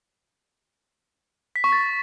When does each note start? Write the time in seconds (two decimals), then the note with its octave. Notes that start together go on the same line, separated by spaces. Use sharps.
1.56 B6
1.64 C#6
1.72 A6